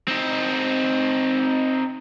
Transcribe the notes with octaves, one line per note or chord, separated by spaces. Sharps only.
C4 D#4